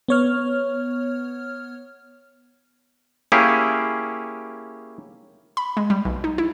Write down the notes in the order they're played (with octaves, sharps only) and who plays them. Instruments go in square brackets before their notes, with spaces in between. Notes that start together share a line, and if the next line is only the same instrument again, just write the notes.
[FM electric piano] B3 C#5 F6
[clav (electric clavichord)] A#3 C#4 E4 G4 G#4
[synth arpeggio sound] B5
G#3
G3
B1
D#4
E4